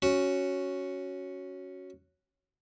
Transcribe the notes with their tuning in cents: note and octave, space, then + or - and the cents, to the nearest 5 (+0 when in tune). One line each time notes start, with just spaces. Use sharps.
C#4 +0 F#4 +0